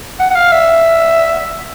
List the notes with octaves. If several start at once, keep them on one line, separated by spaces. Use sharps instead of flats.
F#5
F#5
F5
E5